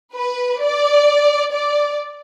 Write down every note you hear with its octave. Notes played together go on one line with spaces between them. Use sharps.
B4
D5
D5